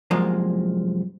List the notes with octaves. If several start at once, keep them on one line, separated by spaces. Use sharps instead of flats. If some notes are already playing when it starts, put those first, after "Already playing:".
C2 F#2 F3 G#3 A#3